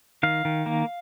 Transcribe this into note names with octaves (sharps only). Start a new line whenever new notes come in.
D#3 F5
D#3
A#3